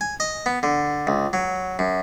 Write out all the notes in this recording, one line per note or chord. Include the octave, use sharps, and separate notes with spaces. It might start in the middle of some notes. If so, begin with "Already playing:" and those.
G#5
D#5
B3
D3
C#2
F#3
F#2